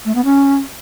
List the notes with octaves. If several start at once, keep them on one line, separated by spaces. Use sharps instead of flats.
A3
B3
C#4